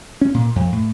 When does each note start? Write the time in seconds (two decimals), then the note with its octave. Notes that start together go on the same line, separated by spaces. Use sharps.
0.21 C#4
0.34 A#2
0.56 F2
0.72 A2